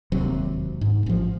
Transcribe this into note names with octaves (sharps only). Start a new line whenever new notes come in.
E1 D#2 C3 F#3
G#2
A1 F3